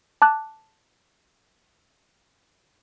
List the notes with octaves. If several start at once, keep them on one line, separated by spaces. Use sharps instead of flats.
A5 D6 F#6